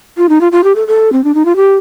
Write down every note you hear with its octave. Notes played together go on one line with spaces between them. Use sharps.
F4
D#4
F4
F4
G4
A4
A4
C4
D4
D#4
F4
G4